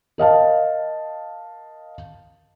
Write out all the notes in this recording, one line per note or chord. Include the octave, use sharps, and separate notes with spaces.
A#4 D#5 F5 A5